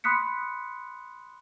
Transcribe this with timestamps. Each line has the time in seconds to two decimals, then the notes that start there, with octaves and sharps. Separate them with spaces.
0.04 B5 C6 D#6 F#6 B6 C#7